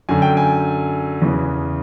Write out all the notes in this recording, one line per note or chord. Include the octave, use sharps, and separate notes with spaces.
F#2 D3 G#5
G5
G#5
E2 C#3 E3